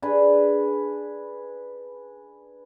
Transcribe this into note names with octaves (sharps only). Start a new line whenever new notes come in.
D4 G#4 B4